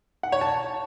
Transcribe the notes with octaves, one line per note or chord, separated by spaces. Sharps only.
F#5
C#5
A5